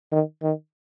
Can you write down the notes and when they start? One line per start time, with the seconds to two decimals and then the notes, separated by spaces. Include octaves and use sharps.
0.12 D#3
0.43 D#3